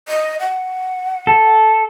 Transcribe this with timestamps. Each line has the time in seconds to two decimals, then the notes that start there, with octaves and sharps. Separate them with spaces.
0.08 D#5
0.40 F#5
1.27 A4